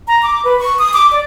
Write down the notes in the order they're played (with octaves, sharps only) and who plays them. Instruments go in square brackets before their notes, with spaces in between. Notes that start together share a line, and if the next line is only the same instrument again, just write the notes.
[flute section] A#5
D6
B4
C#6
D#6
D6
D5